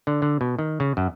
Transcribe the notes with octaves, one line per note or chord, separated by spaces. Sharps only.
D3
D3
B2
D#3
C#3
F#2